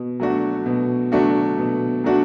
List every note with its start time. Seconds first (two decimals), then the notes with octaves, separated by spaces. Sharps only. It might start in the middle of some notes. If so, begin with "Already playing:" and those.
Already playing: B2
0.20 F#3 A3 D4 F#4
0.66 B2
1.12 F#3 A3 D4 F#4
1.58 B2
2.04 F#3 A3 D4 F#4